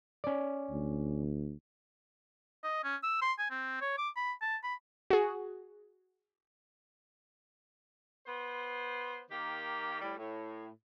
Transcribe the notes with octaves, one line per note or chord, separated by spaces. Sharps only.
C#4 D5
D2
D#5
C#4
E6
C6
G#5
C4
C#5
D6
B5
A5
B5
F#4 G#4
B3 C5
D#3 A#3 G4
A2 G3
A2